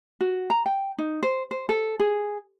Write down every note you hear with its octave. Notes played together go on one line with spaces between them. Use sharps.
F#4
A#5
G5
D#4
C5
C5
A4
G#4